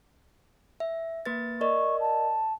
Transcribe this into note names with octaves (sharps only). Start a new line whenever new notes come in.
E5
A#3 B4 A6
A#4 D5 D#5 C#6
A5